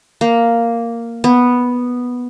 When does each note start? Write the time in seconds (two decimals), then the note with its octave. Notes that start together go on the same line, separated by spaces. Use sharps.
0.21 A#3
1.24 B3